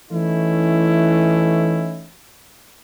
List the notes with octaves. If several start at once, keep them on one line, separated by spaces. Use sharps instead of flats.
E3 A3 C#4 D#4 E4